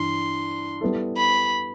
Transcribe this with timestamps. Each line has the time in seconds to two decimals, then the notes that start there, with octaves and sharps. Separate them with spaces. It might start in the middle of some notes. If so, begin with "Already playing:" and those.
Already playing: G2 E3 C6
0.81 G3 B3 E4 A4
1.17 B5